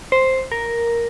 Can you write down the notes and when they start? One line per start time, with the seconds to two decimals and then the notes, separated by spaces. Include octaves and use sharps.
0.12 C5
0.52 A#4